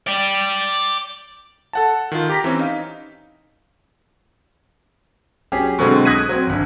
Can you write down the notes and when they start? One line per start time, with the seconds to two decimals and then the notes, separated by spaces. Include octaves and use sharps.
0.07 D5 G5
1.73 A4 F#5 A5
2.12 D#3 F4
2.30 G4 A#5 B6
2.44 E3 C4 C#4
2.59 D#4 F5
5.52 F#3 C#4 G4 G#4
5.79 B2 D3 F#3 G#3 A3 C4
6.05 D#6 F#6 G#6 A#6 B6 D#7
6.29 F#3 C4
6.47 G#1 D2